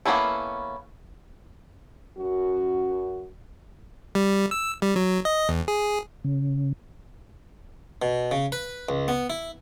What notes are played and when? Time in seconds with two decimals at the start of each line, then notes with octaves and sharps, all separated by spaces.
0.05 A#3 B3 C#4 E4 A4
2.18 F#2 F#4
4.15 G3
4.51 E6
4.82 G3
4.96 F#3
5.25 D#5
5.49 E2
5.68 G#4
6.24 C#3
8.02 B2
8.31 C#3
8.52 B4
8.89 C#2
9.08 B3
9.30 E4